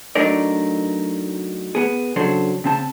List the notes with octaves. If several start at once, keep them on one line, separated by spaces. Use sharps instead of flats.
F#3 A3 D4 D#4 A#4 D5
B3 G#4
C#3 F#3 D4 A4 C5
C#3 C4 A5